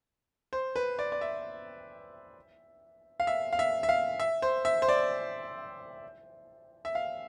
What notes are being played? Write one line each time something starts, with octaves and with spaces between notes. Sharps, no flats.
C5
B4
D5
D5
E5
F5
E5
F5
E5
E5
F5
E5
C5
E5
C5
D5
E5
F5